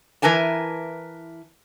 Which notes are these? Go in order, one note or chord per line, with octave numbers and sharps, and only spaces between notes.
E3 A#4 B4 G#5 A5